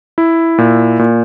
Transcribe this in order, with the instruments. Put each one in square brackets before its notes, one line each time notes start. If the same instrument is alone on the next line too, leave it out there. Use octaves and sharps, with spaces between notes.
[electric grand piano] E4
A#2
A#2